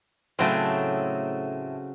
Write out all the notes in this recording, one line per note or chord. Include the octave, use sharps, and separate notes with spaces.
A2 C#3 F#3 A3 C4